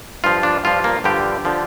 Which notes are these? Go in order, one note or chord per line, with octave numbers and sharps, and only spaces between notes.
G2 F3 F4
D4
G2 F3 F4
A#3
G2 D3 F3 G4
D3 F3